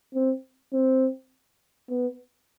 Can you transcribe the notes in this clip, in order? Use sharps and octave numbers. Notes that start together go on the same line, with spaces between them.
C4
C4
B3